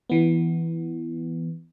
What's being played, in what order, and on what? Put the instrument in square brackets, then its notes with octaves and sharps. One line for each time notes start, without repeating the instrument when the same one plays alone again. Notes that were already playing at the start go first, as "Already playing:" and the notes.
[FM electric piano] E3 B3